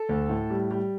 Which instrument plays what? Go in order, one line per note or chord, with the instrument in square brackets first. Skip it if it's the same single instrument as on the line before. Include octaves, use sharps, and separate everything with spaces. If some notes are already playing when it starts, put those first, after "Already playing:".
Already playing: [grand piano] A4
D2
A2
G3
G3